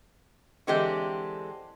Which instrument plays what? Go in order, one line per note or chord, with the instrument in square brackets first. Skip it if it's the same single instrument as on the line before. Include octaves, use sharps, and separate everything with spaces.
[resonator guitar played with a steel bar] D3 E3 G#3 C4 D4 G4